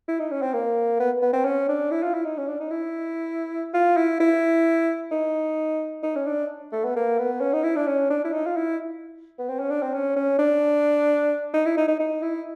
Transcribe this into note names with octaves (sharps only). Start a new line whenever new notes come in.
E4
D#4
C#4
C4
A#3
B3
B3
C4
C#4
D4
E4
F4
E4
D#4
C#4
D4
D#4
E4
F4
E4
E4
D#4
D#4
C#4
D4
A3
B3
A#3
B3
C#4
D#4
E4
D4
C#4
D4
E4
D#4
F4
E4
B3
C4
C#4
D4
C4
C#4
C#4
D4
D#4
E4
D#4
D#4
D#4
E4